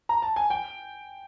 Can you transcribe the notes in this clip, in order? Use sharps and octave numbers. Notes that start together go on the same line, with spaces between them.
A#5
A5
G#5
G5